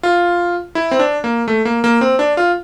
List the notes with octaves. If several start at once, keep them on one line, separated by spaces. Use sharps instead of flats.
F4
E4
C4
D4
A#3
A3
A#3
A#3
C4
D4
F4